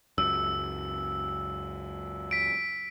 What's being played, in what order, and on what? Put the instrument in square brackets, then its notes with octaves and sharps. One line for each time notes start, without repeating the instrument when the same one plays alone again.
[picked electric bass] C#2 F#2 [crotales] E6
[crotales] B6 D7